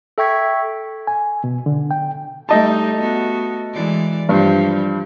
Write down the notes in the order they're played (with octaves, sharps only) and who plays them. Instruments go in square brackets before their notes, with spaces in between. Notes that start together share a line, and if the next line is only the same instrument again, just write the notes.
[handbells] A4 E5 G5 C#6 G#6 B6
[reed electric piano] G#5
B2
D3
G5
[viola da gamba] G3 D#4 [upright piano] A3 D#5 A5
[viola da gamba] B3 F#4
E3 G#3 D5
[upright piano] G2 [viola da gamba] F3 G3